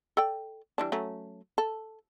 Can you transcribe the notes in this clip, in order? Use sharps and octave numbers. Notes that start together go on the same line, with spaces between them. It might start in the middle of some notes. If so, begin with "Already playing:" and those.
A4 D5 G5
E3 G3 D4
F#3 A3 C#4
A4